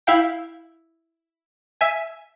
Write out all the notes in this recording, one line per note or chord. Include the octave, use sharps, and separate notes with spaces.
E4 E5 F5 G5
E5 G#5